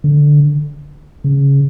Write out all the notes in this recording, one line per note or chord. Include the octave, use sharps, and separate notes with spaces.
D3
C#3